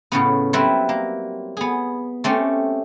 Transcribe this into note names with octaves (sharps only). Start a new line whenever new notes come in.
A2 C#3 B3
F#3 G3 C4 E4 B4
A#3
B3 G#4
A3 C4 C#4 G4